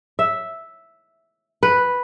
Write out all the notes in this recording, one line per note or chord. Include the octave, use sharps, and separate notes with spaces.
E5
B4